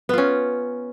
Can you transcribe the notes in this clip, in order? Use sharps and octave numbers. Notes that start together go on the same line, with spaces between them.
B3 C#4 F4